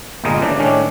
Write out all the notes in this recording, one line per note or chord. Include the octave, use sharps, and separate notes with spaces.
G1 A#2 G3 G#3 A#4 D#5
C#3 E3 D4
A2 D#3 C#4 D4